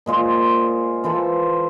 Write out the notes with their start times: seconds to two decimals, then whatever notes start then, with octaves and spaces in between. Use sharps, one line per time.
0.06 A#2 G#3 F4 C5
1.04 E3 F4 A4 C5